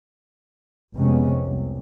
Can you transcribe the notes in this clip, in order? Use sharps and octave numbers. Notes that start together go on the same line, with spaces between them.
F1 C3 G#3 B3 C#4
C2